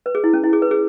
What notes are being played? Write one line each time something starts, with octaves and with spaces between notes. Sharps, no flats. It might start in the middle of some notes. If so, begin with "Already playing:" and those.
B4
G#4
E4
C#4
E4
G#4
B4
G#4